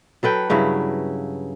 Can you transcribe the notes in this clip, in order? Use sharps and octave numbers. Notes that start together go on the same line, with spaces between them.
F#3 A4 B4 G5
G2 C#3 F#3 E4